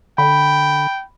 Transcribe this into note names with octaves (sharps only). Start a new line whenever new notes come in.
D3 G5 B5